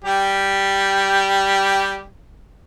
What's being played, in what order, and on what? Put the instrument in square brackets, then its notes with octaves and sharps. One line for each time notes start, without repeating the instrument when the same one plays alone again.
[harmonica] G3 G4